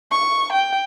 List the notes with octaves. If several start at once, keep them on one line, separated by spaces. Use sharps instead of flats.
C#6
G5